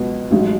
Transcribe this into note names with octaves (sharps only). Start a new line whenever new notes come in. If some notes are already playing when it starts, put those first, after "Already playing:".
Already playing: C#2 B2 F#3 B3
A1 G#2 F#3